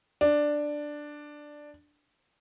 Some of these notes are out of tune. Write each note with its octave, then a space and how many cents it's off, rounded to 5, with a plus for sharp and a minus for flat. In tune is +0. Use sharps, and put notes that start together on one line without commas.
D4 +5